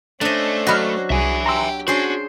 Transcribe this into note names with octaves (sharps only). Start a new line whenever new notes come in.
A3 C#4 D4 C5 D#5
F#3 F#4 D#5 B5 F6
C2 G#4 E5 G#5
G4 A#5 C6 E6
C#4 D4 F#4 G#4 C5